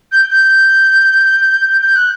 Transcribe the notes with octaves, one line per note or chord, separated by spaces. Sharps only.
G6
G6
G6
G6
F#6